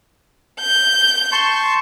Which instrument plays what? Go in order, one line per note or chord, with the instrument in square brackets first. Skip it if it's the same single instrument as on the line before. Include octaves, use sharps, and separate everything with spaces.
[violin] G6
[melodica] A5 C6 C#6